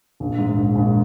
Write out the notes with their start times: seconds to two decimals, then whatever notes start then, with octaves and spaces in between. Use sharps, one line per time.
0.20 A#1
0.38 G#2
0.57 A#1
0.75 A#1